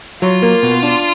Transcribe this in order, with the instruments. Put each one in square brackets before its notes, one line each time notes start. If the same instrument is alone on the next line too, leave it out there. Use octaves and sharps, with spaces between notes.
[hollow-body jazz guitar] F#3 [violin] F4
[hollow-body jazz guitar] A#3
B2
D4